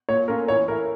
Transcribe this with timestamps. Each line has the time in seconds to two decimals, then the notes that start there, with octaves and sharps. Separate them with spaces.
0.09 A#2 C#5
0.28 A3 C#4 F4 A#4
0.48 E3 C#5
0.68 A3 E4 A#4